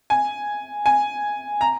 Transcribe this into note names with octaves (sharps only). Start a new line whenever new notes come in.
G#5
G#5
A#5